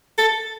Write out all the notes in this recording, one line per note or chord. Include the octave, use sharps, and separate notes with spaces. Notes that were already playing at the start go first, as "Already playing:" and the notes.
A4